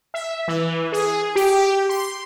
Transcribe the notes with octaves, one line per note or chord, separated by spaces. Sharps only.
E5
E3
G#4
G4
C6